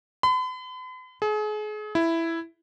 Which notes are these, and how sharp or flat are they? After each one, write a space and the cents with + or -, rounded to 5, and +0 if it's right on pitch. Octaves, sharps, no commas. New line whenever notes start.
B5 +45
G#4 +35
E4 +5